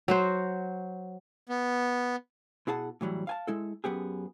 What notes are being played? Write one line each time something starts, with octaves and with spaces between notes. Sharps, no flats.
F#3 F#4 C5
B3
B2 E4 G#4 F#5 A5
A2 E3 F#3 G3
F5 G#5 A5
G#3 E4 A4
F#2 B3 G4 G#4